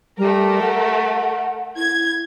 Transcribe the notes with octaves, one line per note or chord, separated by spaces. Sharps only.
G3 A3 A#4
F#5
E4 G#6